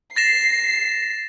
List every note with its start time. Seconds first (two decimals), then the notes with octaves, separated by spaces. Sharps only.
0.16 A6 A#6 C7 E7